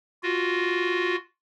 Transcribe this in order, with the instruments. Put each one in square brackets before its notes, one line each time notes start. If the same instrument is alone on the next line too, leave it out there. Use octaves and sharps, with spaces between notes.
[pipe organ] F4 F#4